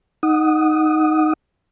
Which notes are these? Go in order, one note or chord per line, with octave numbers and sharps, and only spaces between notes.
D#4 F#5 D#6